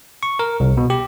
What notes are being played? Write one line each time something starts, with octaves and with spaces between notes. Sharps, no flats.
C#6
A#4
C2
B2
G4